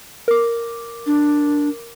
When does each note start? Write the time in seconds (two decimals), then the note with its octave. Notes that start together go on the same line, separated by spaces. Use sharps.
0.28 A#4 D6
1.07 D4